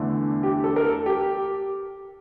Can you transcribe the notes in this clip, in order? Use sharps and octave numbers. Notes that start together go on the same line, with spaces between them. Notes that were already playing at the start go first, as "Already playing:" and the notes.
Already playing: E2 D3 A3
G4
A4
A#4
A4
G4